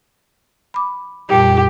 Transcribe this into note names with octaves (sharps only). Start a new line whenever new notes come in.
B5 D6
F2 A#2 G3 G4